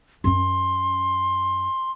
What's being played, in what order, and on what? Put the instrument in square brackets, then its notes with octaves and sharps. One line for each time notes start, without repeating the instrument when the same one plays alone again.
[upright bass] F#2 C#4 [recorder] C6